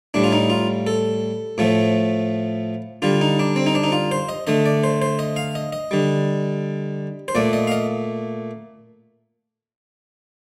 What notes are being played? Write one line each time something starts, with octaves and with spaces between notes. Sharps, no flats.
A2 G3 D4
F4
D#4
F4
A4
A2 F3 A3
D3 G3 F4
D#4
D4
C4
D#4
D4
D#4
F4
C5
D#5
D3 A3 D#5
D5
C5
C5
D#5
F5
D#5
D#5
D3 G3
C5
A#2 A3 D5
D#5
F5
D#5